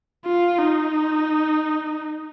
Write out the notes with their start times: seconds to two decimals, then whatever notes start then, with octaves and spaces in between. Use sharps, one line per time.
0.25 F4
0.58 D#4